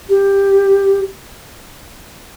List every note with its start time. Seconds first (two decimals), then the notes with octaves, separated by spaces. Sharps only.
0.09 G4